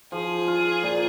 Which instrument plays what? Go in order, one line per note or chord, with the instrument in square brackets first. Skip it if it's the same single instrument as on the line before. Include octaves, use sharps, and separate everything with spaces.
[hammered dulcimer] F3 [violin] G#4
[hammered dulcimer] F4
A#2